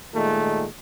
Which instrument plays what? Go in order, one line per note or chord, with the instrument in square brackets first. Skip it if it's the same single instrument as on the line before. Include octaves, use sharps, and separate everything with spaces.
[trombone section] A#2 D#3 G#3 A3